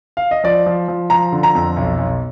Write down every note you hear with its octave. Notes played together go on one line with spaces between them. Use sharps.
F5
D#5
F3 D5
F3
F3
F3 A#5
D3
A#5
F2
B1
B1